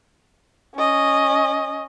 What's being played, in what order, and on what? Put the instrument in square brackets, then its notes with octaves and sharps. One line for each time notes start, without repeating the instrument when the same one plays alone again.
[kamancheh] C#4 D#5